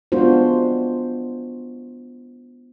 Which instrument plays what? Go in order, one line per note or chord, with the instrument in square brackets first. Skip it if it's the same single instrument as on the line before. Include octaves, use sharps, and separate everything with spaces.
[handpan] G#3 B3 D4 F4 F#4 C5